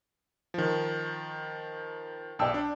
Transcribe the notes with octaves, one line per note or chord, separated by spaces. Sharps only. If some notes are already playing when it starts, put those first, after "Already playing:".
D#3 F3
B1 D5 G5 A5 E6
D4